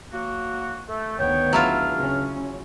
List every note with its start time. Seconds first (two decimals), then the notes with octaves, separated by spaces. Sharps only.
0.12 F#3 A#3 F#4
0.88 A3
1.18 D2 D#3 B3 C#5 G5
1.53 C#2 F#3 D4 E4 F4 F6
1.95 C#3 C#4